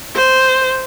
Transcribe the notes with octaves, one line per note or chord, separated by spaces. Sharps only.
C5